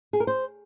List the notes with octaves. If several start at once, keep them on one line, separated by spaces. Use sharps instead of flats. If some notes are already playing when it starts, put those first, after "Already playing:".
G#4
A#4
C5